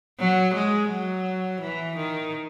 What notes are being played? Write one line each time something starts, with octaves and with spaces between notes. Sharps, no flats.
F#3
G#3
F#3
E3
D#3